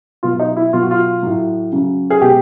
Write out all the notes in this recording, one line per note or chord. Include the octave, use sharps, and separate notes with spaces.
B2 F#3 F4
D#4
E4
B2 F#3 F4
F#4
F4
A2 F#3
C#3 F#3
G#4
B2 G#3 G4